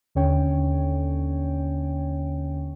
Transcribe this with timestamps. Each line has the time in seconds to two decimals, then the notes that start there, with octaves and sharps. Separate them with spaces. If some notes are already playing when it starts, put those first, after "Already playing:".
0.15 D#2 D3 C#4 C#5 G5